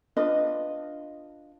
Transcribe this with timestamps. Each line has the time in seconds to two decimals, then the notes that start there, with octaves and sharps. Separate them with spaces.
0.17 D4 F4 B4 D#5